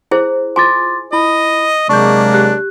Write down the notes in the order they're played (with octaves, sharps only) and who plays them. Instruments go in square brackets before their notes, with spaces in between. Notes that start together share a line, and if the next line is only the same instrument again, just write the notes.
[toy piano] E4 G#4 C5
[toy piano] F4 G#5 [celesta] C6 D6 A6
[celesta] E4 B5 [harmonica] D#5
[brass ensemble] C3 F#3 G#3 [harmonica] A#3 D4 [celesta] C#6 G6
[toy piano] G4 [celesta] F#6